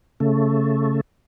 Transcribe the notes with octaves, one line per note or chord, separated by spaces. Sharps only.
C#3 A3